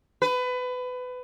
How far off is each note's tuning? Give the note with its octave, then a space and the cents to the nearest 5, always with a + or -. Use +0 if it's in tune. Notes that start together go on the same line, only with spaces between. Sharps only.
B4 +25